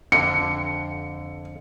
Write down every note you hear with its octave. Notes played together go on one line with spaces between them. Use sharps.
F2 D3 C#7